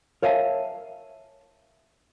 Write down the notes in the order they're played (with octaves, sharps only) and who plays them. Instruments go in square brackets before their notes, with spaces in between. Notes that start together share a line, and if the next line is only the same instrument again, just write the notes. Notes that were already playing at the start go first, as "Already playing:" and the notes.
[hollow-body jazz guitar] A#4 C#5 E5 F5 G#5 A5